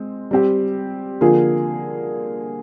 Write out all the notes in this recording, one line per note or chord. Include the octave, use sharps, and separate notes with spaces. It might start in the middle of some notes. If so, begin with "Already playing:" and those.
Already playing: G#3 C4
G3 C4 G4
D3 F3 A#3 F4 G#4